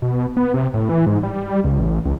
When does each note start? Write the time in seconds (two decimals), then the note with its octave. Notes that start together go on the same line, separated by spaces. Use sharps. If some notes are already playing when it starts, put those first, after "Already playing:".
0.02 B2
0.37 B3
0.54 C3
0.74 A2
0.89 E3
1.06 G#2
1.23 G3
1.64 C#2
1.79 A1
2.05 C#2